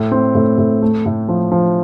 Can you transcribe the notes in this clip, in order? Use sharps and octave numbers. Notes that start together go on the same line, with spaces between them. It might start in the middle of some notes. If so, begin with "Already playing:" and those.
Already playing: A2
C4
A2
A2
A3
A2
F3
F3